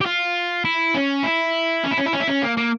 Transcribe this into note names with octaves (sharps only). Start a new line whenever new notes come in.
G4
F4
E4
C#4
E4
C#4
E4
C#4
E4
C#4
E4
C#4
A#3
A#3